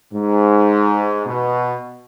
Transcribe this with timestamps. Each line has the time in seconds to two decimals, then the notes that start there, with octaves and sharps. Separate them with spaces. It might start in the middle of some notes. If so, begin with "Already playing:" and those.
0.12 G#2
1.26 B2